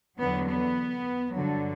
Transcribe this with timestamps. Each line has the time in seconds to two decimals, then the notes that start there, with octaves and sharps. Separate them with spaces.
0.19 E2 D3 F#3 B3
0.48 B3
1.35 G2 D3 F#3